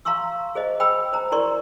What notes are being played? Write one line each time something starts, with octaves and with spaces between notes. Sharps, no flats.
F5 A#5 C6 C#6 E6
G#4 C5 D#5
C5 G5 B5 E6
C5 A#5
E4 A#4 D5 C6 C#6